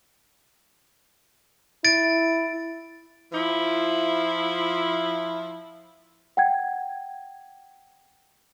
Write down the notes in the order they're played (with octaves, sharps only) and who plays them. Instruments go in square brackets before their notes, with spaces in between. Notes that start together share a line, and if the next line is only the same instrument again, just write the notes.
[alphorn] E4 [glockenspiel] A6 D7
[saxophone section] F3 E4
[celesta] F#5 G5 G#6